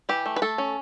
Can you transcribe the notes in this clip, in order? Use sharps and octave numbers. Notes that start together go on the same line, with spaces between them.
E3 G4
A3
B4
A3 A4
C#4